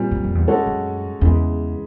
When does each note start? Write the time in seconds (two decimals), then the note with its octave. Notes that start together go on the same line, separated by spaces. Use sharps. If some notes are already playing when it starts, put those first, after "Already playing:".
Already playing: A#2 G3 C4 F4
0.11 F#2
0.24 F2
0.35 E2
0.47 G#3 C#4 F#4 A4 C#5
0.66 F#2
1.21 E2 C#3 E3 G#3